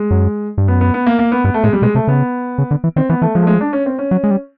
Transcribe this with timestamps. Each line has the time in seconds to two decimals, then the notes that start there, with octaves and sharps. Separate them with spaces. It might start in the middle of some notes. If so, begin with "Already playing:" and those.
Already playing: G#3
0.11 F#2
0.58 G2
0.68 F#2 B3
0.81 B3
0.94 B3
1.07 A#3
1.19 A#3
1.32 B3
1.44 G2 B3
1.54 A3
1.64 A2 G#3
1.73 G3
1.82 B2 G#3
1.95 C3 A3
2.08 C#3 B3
2.58 C#3
2.71 D3
2.84 E3
2.96 D#3 C4
3.09 E3 B3
3.22 E3 A3
3.35 F3 G#3
3.42 A3
3.47 G#3
3.61 D4
3.73 C#4
3.86 C4
3.99 C#4
4.11 F#3
4.24 G#3
4.31 G3